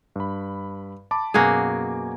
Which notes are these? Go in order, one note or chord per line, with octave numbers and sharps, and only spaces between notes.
G2 B5
A5 B5 D6
F#2 B2 A#3 F#4 G#4 G#5